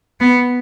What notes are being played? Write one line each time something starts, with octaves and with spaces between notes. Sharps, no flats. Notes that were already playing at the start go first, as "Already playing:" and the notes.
B3